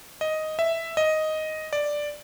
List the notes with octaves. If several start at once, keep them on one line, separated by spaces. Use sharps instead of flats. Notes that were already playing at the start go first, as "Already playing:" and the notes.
D#5
E5
D#5
D5